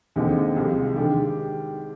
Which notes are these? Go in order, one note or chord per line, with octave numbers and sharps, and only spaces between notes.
D#2 D3 G#3 C4 D#4
C2 C3 F3 G#3 C4
D#3 G#3 D4 G4